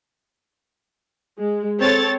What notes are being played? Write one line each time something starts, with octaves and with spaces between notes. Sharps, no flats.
G#3
C4 A4 C#5 A6